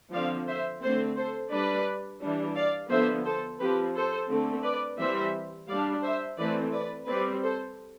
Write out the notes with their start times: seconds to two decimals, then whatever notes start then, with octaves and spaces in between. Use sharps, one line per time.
0.13 D3 F3 C4 D5 F5
0.47 C5 E5
0.82 D3 A3 C4 A4 C5
1.17 A4 C5
1.52 G3 D4 B4 D5
2.21 E3 G3 D4
2.56 D5 F5
2.91 D3 F3 B3 C5 E5
3.25 A4 C5
3.60 F3 C4 G4 B4
3.95 A4 C5
4.30 D3 A3 C4
4.64 B4 D5
4.99 E3 G3 C4 C5 E5
5.68 G3 D4 D5 F5
6.03 C5 E5
6.38 E3 A3 C4 B4 D5
6.73 B4 D5
7.07 G3 C4 B4 D5
7.42 A4 C5